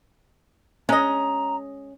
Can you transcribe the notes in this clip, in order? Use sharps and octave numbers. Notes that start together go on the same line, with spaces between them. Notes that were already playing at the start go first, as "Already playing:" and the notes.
G#3 C#4 D#5 A#5